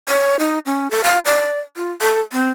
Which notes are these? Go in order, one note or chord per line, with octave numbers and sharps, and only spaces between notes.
C#5
D#4
C#4
A4
F5
D5
F4
A4
C4